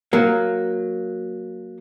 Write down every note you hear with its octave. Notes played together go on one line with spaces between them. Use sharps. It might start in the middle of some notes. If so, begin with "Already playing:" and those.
F#3 A#3